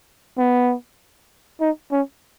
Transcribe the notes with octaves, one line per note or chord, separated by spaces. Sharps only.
B3
D#4
C#4